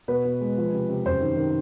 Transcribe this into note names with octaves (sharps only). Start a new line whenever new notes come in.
B2 B4
B2
G#3
F3
C3
C3
F#2 C5
D#3
D#3